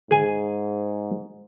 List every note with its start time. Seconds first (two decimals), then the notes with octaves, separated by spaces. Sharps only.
0.11 G#2 G#4 G#5